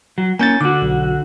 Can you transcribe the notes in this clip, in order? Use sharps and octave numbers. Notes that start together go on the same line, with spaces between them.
F#3
A#3 C#4 G#5 G6 A6
D3 F#4 D6
B1